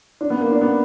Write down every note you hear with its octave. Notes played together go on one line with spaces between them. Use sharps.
D4
B3
A#3
D4
B3